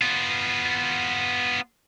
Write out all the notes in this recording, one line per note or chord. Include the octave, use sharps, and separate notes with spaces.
B3 F4